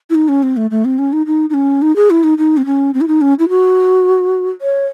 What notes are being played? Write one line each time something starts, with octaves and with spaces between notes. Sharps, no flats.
E4
D#4
C#4
C4
A3
A3
C4
C#4
D#4
D#4
D#4
C#4
D#4
G#4
E4
D#4
D#4
C4
C#4
C4
E4
D#4
C#4
E4
F#4
C#5